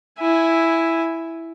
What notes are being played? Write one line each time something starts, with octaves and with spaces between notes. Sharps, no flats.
E4 G#5